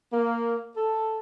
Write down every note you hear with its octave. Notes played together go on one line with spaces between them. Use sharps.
A#3
A4